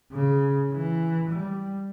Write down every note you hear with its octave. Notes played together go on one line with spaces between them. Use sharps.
C#3
E3
G3